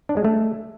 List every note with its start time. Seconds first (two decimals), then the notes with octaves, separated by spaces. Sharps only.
0.09 D4
0.17 G#3
0.25 A3